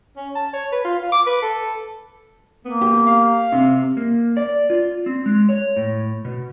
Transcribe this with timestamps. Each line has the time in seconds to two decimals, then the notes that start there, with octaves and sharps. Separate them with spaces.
0.17 C#4
0.36 A5
0.54 C#5
0.72 B4
0.84 F4
0.99 F5
1.12 D6
1.27 B4
1.42 A4
2.65 A#3 B3
2.81 G4
3.07 F5
3.52 C3
3.97 A#3
4.37 D5
4.70 F4
5.06 C4
5.26 G#3
5.49 C#5
5.76 A2
6.25 B2